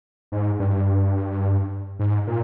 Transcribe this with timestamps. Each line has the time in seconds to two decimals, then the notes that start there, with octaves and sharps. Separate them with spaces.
0.32 G#2
0.59 G2
1.99 G#2
2.27 A#2